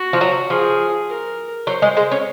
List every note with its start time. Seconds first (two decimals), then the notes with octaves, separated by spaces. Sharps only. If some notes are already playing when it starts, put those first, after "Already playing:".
Already playing: F#4
0.13 F3
0.21 F#3
0.50 F3 G#4
1.09 A#4
1.67 F#3 C5
1.82 G#3
1.97 G#3
2.12 C#4